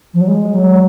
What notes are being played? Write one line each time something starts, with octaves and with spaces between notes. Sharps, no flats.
F3
F#3
G#3
F#3